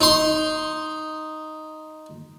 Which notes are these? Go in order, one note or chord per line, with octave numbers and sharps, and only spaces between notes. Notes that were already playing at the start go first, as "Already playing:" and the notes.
D#4 C6